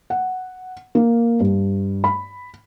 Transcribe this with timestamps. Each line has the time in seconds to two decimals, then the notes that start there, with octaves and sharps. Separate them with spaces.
0.10 F#5
0.95 A#3
1.40 G2
2.04 B5